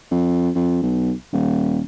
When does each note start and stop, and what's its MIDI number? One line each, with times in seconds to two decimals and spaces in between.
0.11 0.50 41
0.55 0.80 41
0.83 1.13 35
1.33 1.81 27